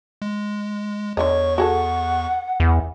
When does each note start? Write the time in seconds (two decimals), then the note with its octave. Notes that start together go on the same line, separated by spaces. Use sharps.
0.22 G#3
1.17 E2 D3 A3 C#5 D#5 C#6
1.58 F#4 G#4 A4 F#5
2.60 E2